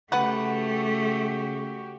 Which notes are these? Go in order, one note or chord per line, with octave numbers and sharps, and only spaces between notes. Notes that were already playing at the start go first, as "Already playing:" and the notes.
C#3 A3 B3 F#4 G4 B4 F#5